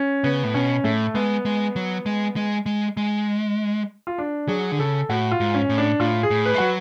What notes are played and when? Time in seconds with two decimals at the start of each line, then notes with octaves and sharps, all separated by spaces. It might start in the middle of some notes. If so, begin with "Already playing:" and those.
Already playing: C#4
0.24 C#3 B3
0.44 A2
0.54 B2 C#4
0.84 A2 A3
1.15 G#3 B3
1.45 G#3
1.76 F#3
2.06 G#3
2.36 G#3
2.66 G#3
2.97 G#3
4.07 F4
4.18 D4
4.48 F#3 G#4
4.72 D3
4.79 C#3 A4
5.10 A2 F#4
5.31 F4
5.40 G#2
5.54 C#4
5.69 A2
5.78 D4
6.00 A2 F4
6.23 G#4
6.31 A2
6.46 B4
6.54 G#3
6.58 F#3 F#4